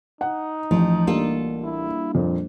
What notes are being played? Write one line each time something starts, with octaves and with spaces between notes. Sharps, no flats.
D#4 F#5
A1 F3
G3 A#3 D4 F4 A4
E4
F2 A#2